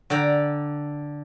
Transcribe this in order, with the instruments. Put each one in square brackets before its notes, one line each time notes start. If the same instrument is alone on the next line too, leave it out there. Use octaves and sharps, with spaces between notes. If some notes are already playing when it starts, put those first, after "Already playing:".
[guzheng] D3 D5 G5 A#5